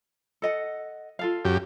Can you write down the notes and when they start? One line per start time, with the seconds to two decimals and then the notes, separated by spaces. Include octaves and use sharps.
0.42 A4 D#5 F#5
1.19 F4 A4 F5
1.45 F#2 G4